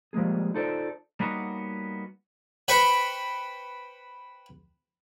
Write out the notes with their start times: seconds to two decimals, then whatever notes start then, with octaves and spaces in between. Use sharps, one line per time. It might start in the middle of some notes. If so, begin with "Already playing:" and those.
0.13 F3 G3 G#3 A#3 G#4
0.54 D#4 F4 A4 C5 D5
1.20 G3 A#3 B3 C#4 D#4 F#4
2.68 B4 C5 G5 B5 C#6